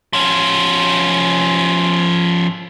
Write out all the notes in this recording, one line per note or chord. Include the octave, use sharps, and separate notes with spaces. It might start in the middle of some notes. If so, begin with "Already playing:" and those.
F3 C#4